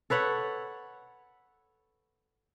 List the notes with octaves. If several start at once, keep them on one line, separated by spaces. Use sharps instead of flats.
A4 B4 C#5 F#5